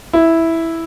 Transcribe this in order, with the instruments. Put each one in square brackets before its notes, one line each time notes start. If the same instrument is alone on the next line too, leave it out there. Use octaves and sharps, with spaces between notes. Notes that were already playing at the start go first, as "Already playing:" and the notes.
[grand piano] E4